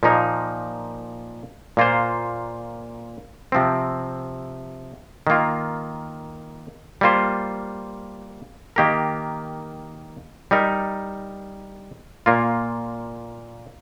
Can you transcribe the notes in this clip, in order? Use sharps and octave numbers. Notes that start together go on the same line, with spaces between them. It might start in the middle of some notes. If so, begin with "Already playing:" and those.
A#2 F3 A#3 D#4 A#4
A#2 A#3 F4 C5
C3 F3 C4
D#3 A#3 F4
G3 A#3 F4 C5
D#3 A#3 G4 A#4
G3 D#4 A#4
A#2 A#3 F4